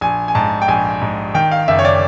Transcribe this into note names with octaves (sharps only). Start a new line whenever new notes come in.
A#1 G#5
G#5
G#2 A5
G5
A#1 G#5
G#2
D#3 G5
F5
F#1 E5
C#5
D5